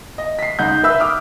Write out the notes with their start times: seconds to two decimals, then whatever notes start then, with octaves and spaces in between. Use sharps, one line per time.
0.18 D#5
0.39 B6 C7
0.59 C#2 D#4 F#5 G6
0.83 B4 E5 E6
1.00 D6 D#6 F6